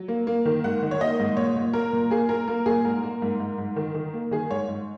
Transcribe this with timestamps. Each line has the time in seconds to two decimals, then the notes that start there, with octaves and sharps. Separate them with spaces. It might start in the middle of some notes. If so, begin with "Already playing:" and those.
Already playing: F#3
0.08 A#3
0.27 A#3
0.45 D#3
0.64 G#2 F#5
0.83 D#3
0.91 C#5
1.01 A#3 D#5
1.19 G#2
1.37 A#2 C#5
1.55 A#2
1.73 A#3 A#4
1.93 A#2
2.10 A#3 G#4
2.29 A#3 A#4
2.48 A#3 A#4
2.66 A#2 G#4
2.85 G#2 A#4
3.03 A#3
3.22 G#2
3.40 G#2
3.58 G#2
3.76 D#3
3.94 D#3
4.13 A#3
4.31 D#3 G#4
4.50 G#2 C#5
4.68 G#2